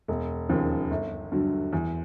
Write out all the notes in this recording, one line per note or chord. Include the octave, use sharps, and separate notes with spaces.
E1
D#2 C#3 F3
G1
G2 D3 F#3
E2